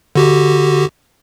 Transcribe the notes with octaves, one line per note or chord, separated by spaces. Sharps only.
D3 F#4 G4